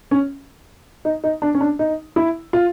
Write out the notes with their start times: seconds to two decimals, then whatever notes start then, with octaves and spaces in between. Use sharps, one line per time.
0.11 C#4
1.05 D#4
1.24 D#4
1.42 D4
1.55 C#4
1.61 D4
1.79 D#4
2.16 E4
2.53 F4